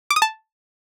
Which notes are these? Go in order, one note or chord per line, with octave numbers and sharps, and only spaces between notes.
D6
D#6
A5